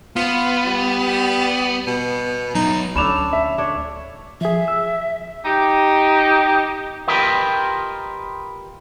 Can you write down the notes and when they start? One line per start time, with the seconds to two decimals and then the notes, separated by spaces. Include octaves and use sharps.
0.16 B3 F4
0.66 G3
1.87 B2
2.55 F#3 D#4 E5
2.95 D2 C#4 D4 A4 B5 E7 F7
3.33 E5
3.58 D4 C#5
4.41 F3 G#4 E5
4.68 E6
5.45 D#4 G4
7.08 F4 G4 A#4 B4 D#5